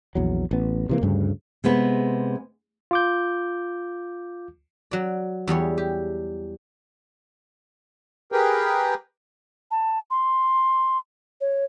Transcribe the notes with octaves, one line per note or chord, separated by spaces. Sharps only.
A#1 E2 F#3
A1 B3
C3 E3 A#3
D2 G2 C#3
C3 G#3 B3 B4
F4 D6 G6
F#3 D5
E2 G3 G#4 C#5
G4
G4 G#4 A#4 B4 G5
A5
C6
C#5